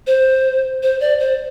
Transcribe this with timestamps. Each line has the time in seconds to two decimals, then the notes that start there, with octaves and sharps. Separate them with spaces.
0.07 C5
0.83 C5
1.01 D5
1.20 C5